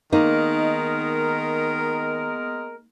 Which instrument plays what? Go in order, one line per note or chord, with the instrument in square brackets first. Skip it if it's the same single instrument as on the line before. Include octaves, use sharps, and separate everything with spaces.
[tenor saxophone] D#3 [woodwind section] G#3 B3 A#4 [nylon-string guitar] A#3 D#4